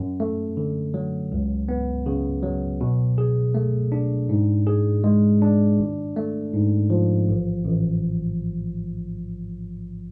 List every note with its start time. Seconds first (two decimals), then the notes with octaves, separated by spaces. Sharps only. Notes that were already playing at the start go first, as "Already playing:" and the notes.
Already playing: F#2
0.20 A3
0.57 D3
0.94 F#3
1.32 C#2
1.68 B3
2.06 C#3
2.43 F#3
2.81 B2
3.18 G#4
3.55 A3
3.92 D4
4.29 G#2
4.67 G#4
5.04 G#3
5.42 D4
5.79 G#1
6.16 A3
6.54 G#2
6.90 F3
7.29 A1
7.65 A1